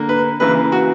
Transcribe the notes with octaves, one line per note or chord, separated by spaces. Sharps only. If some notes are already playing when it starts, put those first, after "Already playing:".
Already playing: D3 A#3
B4
C#3 E3 A#3 B4
F#4